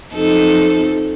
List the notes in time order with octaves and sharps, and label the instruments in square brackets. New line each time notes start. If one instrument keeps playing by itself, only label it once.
[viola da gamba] F2 D#4 A4